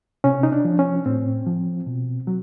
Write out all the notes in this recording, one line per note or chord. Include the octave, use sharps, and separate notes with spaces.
C3 C#4
D#4
D4
F3
C#4
A2 C4
F3
B2
F#3